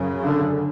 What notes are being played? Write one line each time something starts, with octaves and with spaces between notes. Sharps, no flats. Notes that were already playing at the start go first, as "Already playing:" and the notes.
Already playing: F#2 C#3
D3